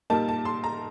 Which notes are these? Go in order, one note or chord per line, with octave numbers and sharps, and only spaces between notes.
A#2 G3 A#3 D#4 A5
A5
C6
A#5